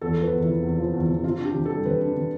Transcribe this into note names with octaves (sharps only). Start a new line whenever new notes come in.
E2 A4
F3 B4
E2
C3 E4
E2
F3
E2
C3
C3 F4
D4 G4
C3
G3 A4
C3 B4
D4
C3